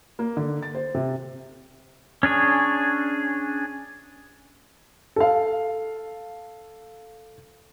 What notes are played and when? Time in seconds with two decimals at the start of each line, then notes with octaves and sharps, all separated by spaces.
0.19 A#3
0.37 D3
0.63 A6
0.75 C5
0.94 C3
2.23 C#4 D4 G#4 C#5
5.16 A4 F5